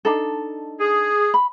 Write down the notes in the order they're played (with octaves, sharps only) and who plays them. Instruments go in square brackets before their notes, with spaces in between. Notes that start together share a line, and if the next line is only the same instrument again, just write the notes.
[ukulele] D4 D#4 A4
[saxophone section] G#4
[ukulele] B5